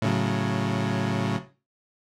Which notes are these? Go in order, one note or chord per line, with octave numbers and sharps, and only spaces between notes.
A2 C#3 F#3